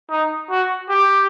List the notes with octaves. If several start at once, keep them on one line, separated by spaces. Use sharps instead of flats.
D#4
F#4
G4